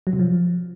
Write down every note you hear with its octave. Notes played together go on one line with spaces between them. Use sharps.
F#3
C3
F3